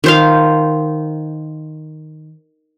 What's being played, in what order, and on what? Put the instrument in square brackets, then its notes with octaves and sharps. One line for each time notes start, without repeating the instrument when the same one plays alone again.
[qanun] D#3 C5 F5